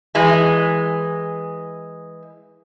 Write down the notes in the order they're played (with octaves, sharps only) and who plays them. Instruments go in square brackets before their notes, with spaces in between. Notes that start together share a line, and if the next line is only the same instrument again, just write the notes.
[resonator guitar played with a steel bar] E3 G#3